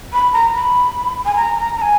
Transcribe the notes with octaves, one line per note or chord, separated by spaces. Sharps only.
B5
A#5
B5
G#5
A#5
A#5
A#5
G#5